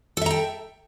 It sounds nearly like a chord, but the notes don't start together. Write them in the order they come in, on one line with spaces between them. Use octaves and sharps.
A4 E5 A#5 G5